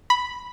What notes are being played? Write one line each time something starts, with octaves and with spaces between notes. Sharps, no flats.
B5